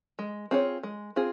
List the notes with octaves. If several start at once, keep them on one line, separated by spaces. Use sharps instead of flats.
G#3
C4 F4 G#4 C#5
G#3
C4 F4 G#4